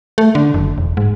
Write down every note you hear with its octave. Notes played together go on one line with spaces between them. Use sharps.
A3
D3
F#1
E1
G#2